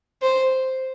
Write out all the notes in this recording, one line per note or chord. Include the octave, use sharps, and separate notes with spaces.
C5